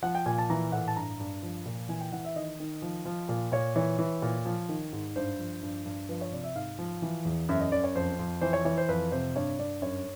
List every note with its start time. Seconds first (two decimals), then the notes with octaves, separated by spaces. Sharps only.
0.03 F3 F#5
0.15 G5
0.26 A#2 G#5
0.38 A5
0.50 E3 A#5
0.72 A2 F#5
0.88 A5
0.96 G2 A#5
1.20 G2
1.43 F3
1.66 A#2
1.89 E3 G#5
2.00 G5
2.12 E3 F#5
2.25 E5
2.36 D#3 D#5
2.60 D#3
2.82 F3
3.05 F3
3.29 A#2
3.52 A#2 C#5
3.76 E3 C#5
3.99 E3
4.22 A#2
4.45 F3
4.69 D#3
4.93 G#2
5.16 G2 C5
5.39 F3
5.63 G2
5.85 G2
6.09 F3 B4
6.21 C#5
6.32 C3 D5
6.44 E5
6.55 G#2 F5
6.79 F3
7.02 E3
7.25 E2
7.49 F#2 E5
7.60 D#5
7.72 F#2 D5
7.84 C#5
7.95 F2 C5
8.19 F2
8.41 E3 C5
8.53 C#5
8.65 E3 C#5
8.78 C5
8.89 F2 B4
9.12 C3 C5
9.36 G2 C#5
9.59 G2 D5
9.82 F#2 C#5